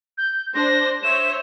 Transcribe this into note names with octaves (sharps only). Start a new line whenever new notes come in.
G6
D4 C5 A#6
C5 C#5 E5 E7